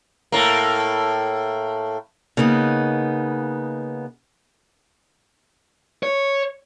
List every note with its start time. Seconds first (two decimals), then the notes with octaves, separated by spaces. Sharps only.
0.32 A2 A#3
2.37 C#3 A#3 B3 D#4
6.03 C#5